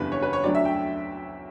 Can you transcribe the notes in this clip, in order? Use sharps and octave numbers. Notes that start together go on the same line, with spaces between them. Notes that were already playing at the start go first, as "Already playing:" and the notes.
Already playing: F#1 E2 D3 G3 B4
C#5
B4
C#5
D2 D3 F#3 D5
E5
G5